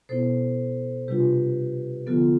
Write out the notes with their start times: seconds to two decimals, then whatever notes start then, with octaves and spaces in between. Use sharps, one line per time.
0.09 B2 B3 E4 A4 C5
1.08 C3 G3 D4 F4 G4 B4
2.07 D3 F3 B3 F4 A4